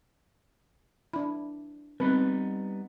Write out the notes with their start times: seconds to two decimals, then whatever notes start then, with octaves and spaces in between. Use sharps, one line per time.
1.13 D4 E4 B5
2.00 G3 B3 C4 D#4 B4